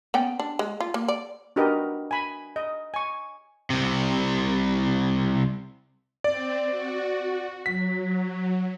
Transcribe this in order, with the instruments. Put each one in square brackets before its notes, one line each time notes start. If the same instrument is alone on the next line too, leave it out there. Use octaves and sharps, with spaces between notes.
[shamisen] B3 C#4 G5
D4
G#3
F4
A#3
D5
[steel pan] D4 F#4 G4 A#4 B4 D#5
G#5 B5
D#5
G#5 C#6
[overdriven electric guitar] C2 C3
[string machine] C4 [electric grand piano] D5
[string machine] F#4
[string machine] F#3 [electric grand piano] B6